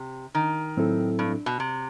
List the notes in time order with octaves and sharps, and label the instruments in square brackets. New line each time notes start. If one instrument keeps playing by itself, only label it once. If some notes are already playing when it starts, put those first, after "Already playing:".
Already playing: [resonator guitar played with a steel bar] C3
D#3
[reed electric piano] A2 F#3 C4 E4 A4
[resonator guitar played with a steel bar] G2
B2
C3